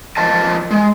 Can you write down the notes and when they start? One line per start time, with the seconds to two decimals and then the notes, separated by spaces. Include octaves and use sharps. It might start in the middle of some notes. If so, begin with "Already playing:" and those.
0.17 F3 A#4 C5 D#5 A5
0.71 G#3